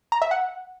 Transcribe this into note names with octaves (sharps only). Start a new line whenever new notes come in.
A#5
E5
F#5